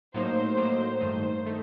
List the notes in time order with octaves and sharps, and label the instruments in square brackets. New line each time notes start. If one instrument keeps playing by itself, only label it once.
[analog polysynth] A2 F#3 A#3 D#4 [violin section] C5
[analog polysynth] A2 F#3 A#3 D#4 [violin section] C5
[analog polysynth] G2 D#3 A3 D#4 [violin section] C5
[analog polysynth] D#3 A3 D#4